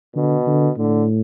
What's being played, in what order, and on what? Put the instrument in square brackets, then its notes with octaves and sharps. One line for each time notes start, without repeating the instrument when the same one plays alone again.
[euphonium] B2 [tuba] D3
[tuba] D3
[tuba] A2 [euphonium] D3